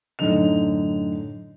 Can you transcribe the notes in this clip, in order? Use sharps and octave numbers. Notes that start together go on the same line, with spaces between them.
F#2 A2 D3 D#4 F7